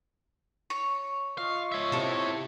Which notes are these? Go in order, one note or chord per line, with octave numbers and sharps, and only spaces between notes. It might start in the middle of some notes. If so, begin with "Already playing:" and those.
C#5
F4 D#5 F5 C#6
C#5 E5
C3 E4 A4